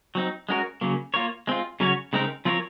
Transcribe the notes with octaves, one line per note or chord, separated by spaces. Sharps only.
F#3 C4 D#4
G#3 C#4 F#4 A#4 C#5
C#3 F#3 A#3
A#3 F4 A#4 C#5
G#3 C4 F4
C#3 F#3 C#4 F#4 C#5
C#3 G#3 C4 D#4 A#4
F3 C4 F4 A#4 C#5